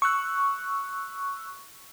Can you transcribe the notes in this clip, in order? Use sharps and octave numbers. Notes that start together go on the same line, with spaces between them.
C#6 E6 F#6